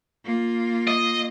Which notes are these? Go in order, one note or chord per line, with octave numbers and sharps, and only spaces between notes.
A#3 F4
D#5